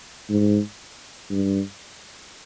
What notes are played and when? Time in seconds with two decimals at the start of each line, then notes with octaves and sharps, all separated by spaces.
0.29 G#2
1.30 G2